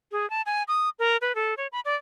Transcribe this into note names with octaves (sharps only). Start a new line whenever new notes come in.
G#4
A5
G#5
D#6
A#4
B4
A4
C#5
B5
D5